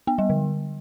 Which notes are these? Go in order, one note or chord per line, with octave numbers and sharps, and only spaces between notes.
B3
G3
D3